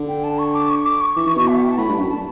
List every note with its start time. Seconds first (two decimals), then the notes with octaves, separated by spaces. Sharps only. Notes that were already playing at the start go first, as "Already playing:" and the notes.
Already playing: D3
0.08 G5
0.24 A5
0.39 C#6
0.54 D6
0.70 C#6
0.85 D6
1.01 C#6
1.16 E3
1.26 E3
1.37 B2
1.48 E5
1.56 F#5
1.63 G5
1.71 A5
1.78 A2 B5
1.88 G2
1.99 F#2
2.09 A5